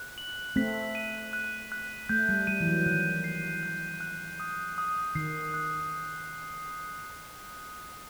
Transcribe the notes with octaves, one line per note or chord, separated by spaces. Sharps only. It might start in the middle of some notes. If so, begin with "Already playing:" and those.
Already playing: F#6
F#7
A3 C4 B6
D#7
F#6
F#6
A3 G6
G3
G3 D#7
E3
F#3
D#3 F#6
C7
F#6
F#6
D#6
D#6
D#3 C7
F#6